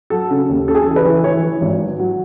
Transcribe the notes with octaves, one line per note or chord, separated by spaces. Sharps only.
F#3 A4
C#3
D#2
C#3 A4
G#4
A4
E3
B4
E3
E3 C#5
E3
G#1
F#3
F#3